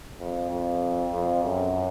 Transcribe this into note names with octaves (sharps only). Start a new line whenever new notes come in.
F2
F2
F2
F#2